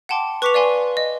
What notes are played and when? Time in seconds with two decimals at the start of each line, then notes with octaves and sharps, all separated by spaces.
0.09 F#5 G5 A5 C6 D6
0.42 B4 C#6 D6 B6 C#7 F7
0.54 D5 F5 G#5 C6
0.97 D#5